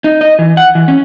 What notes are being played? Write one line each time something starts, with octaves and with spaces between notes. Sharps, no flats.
D#4
D#5
E3
F#5
E3
C#4